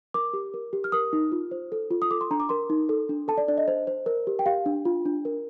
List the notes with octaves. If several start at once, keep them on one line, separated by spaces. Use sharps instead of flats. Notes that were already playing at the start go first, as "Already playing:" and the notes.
A#4 D6
G4
A#4
G4
F6
A#4 D#6
D#4
F4
C5
A4
F4
D#6
A4 D6
C6
D4 A#5
D6
A#4 C6
D#4
A4
D4
A4 A5
D5
D4 D5
D#5
C5
C5
A#4
G4
G5
G4 F5
D4
F4
D4
A#4